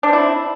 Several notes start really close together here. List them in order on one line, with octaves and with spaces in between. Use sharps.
D4 C4 E4